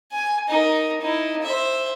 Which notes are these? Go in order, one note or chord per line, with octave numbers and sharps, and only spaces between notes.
G#5
D#4 A#4
D#4 E4
C5 E5